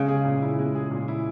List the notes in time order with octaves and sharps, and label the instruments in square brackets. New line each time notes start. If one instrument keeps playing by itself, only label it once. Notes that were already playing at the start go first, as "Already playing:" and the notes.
Already playing: [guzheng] C#3 [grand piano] G#3
[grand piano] G#4
A#2
E4
G#3
G#4
A#2
E4